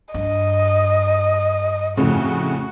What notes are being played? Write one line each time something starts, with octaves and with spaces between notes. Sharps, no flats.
G2 D#5
F2 A2 C#3 F#4